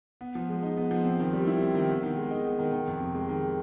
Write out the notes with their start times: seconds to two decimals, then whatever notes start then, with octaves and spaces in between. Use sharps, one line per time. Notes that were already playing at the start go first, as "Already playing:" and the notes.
0.21 B3
0.35 F3
0.49 G#3
0.63 D#4
0.77 B3
0.91 F3
1.05 C4
1.20 D#3
1.33 G3
1.47 E4
1.60 C4
1.75 D#3
1.89 B3
2.03 D#3
2.17 G#3
2.31 D#4
2.45 B3
2.59 D#3
2.72 D#3
2.88 F2
3.00 C3
3.15 G#3
3.29 D#3